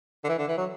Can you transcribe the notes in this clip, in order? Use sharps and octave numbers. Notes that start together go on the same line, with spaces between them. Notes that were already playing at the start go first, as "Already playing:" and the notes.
D3
E3
D3
E3
F#3